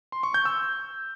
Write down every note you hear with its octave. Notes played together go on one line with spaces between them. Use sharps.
C6
C#6
G6
E6